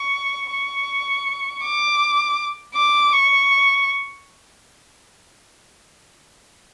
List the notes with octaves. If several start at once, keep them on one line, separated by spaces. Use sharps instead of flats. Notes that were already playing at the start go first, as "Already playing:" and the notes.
Already playing: C#6
C#6
D6
D6
C#6